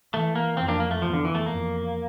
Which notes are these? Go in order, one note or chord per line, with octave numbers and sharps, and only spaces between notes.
E3 A3
A#3
F2 C4
A#3 D4
A#3
A3
E2 F3
D3
E3
A3
F2 A#3